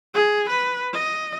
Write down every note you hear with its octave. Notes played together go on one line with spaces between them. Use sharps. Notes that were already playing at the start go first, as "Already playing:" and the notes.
G#4
B4
D#5